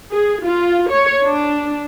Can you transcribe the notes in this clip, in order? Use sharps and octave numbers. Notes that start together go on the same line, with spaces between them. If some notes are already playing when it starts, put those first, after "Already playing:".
G#4
F4
C#5
D4